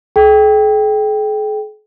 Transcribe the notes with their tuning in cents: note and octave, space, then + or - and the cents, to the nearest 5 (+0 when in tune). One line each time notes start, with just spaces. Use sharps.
G#4 +45 G5 +0